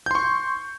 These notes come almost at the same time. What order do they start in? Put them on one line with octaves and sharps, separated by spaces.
G6 C6 C#6